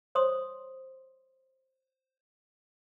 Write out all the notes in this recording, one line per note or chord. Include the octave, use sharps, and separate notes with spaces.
C5 C#5 C6 D#6